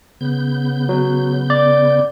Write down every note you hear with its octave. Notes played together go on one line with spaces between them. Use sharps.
C#3 B3 G6
F#3
D5